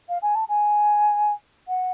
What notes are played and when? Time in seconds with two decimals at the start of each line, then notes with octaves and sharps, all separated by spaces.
0.08 F5
0.22 G#5
0.35 A5
0.49 G#5
1.68 F#5